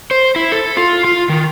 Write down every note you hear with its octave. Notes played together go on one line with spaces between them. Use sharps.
C5
E4
A4
F4
F4
D#3